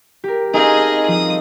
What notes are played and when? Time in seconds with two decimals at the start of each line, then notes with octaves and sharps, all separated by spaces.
0.24 G4 A#4
0.54 C4 C#4 D#4 G#4 A4 D#5 F5
1.08 F3 D#6